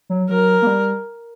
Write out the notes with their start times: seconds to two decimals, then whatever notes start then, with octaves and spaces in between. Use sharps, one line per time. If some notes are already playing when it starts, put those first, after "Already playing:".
0.10 F#3
0.29 F#3 A#4
0.62 A#3
0.67 G3